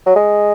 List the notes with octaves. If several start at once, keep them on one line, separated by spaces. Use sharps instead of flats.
F#3
G#3